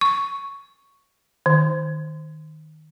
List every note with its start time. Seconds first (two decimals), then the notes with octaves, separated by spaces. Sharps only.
0.01 C#6
1.46 D#3